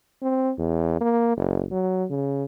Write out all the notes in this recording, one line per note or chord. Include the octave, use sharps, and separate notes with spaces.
C4
E2
A#3
F#1
F#3
C#3